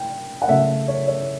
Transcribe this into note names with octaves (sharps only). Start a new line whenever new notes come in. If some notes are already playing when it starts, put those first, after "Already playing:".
Already playing: G5
F#5
C#3 F#3 A3 E5
C#5
C#5